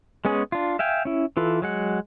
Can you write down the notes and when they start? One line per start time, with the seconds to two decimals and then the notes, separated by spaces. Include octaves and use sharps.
0.25 G#3 B3 C#4 G#4
0.52 D4 F4
0.79 E5 F5 G5 G#5
1.05 C#4 E4
1.37 E3 F4 A4 B4
1.62 F#3 G#3 F#5